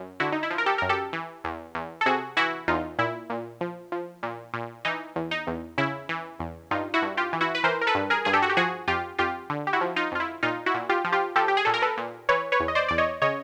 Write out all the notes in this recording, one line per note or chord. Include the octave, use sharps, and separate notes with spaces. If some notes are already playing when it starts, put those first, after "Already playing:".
Already playing: F#2
D3 E4 F#4
D#4
E4
F3
A#4
G4 A4
F#2 A#4
G4 A4
E3
E2
E2
A4
C3 F#4 G#4
E3 E4 F#4
E2 D#4 F4
A#2 E4
A#2
F3
F3
A#2
A#2
E3 D#4
E2
D#4
E2
C#3 E4
E3
E2
G2 D#4 F4
E4 F#4
G2
F4 G4
E3
E4 F#4
B4
E3 A#4 C5
A#4
A4 B4
G2
G#4 A#4
G2 G#4
G4 A4
F#4
G4
F3 F#4 G#4
F2 F4 G4
F2 F4 G4
D3
G4
E4 F#4
F3
D#4 F4
F2 F4
E4
A#2 D#4 F4
E4 F#4
A#2
F4 G4
F3
F4 G4
F3 G4 A4
G4
G#4
A#2 A4
A#4
A4 B4
A#2
E3 B4 C#5
B4 C#5
E2
D#5
C5 D5
E2 D5
C#5 D#5
C#3 C#5 D#5